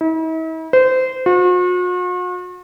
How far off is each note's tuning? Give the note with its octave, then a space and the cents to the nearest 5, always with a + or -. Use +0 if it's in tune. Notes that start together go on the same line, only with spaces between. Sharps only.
E4 -45
C5 -25
F#4 -45